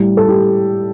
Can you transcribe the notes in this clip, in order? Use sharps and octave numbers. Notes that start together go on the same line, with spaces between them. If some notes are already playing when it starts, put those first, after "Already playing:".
Already playing: A2 G3
A4
G4